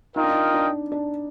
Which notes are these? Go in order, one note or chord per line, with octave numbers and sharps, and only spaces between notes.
D#4 F4 A#4 D#5 G5
D4
D#4
D4
D4